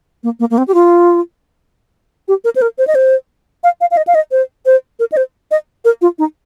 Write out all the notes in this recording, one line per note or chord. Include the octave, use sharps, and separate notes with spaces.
A#3
A#3
A#3
C4
G4
F4
G4
A#4
C5
A#4
C5
D#5
C5
F5
F5
F5
D#5
F5
D#5
C5
C5
A#4
D#5
C5
D#5
A#4
F4
D#4